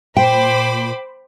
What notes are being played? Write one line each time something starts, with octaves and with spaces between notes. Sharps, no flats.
A#2 C5 G5 B5 D6